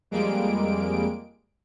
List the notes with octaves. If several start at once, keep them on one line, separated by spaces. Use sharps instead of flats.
F2 G3 G#3 A#3 D7